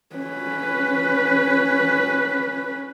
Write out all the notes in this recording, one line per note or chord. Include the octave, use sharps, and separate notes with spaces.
C#4 B4